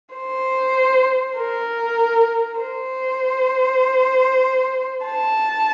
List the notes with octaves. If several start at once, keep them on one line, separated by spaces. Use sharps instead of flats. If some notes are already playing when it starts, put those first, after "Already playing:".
C5
A#4
C5
A5